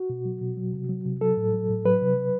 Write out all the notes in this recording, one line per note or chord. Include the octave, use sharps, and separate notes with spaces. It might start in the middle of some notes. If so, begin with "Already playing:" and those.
Already playing: F#4
B2
F#3
B2
F#3
C3
F#3
C3
F#3 A4
A2
F#3
A2
F#3 B4
C3
F#3